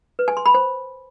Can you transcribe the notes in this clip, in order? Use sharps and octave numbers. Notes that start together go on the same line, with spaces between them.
B4
G#5
C6
B5
C5